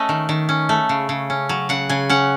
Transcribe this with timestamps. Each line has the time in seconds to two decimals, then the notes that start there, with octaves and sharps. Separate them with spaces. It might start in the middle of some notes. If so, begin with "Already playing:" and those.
Already playing: A3 C#4 D#5
0.09 D#3
0.29 D#3
0.49 C#4
0.69 A3
0.89 C#3
1.09 C#3
1.30 C#4
1.49 F#3
1.69 C#3 F#5
1.89 C#3 G#5
2.10 C#4 F#5